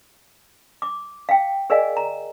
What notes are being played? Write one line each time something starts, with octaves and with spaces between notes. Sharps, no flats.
D6
F5 G5
G#4 A#4 D5 D#5 F5 G#5
A#5